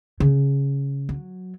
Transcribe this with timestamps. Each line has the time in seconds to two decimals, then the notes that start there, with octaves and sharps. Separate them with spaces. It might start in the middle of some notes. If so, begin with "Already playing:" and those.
0.20 C#3
1.09 F#3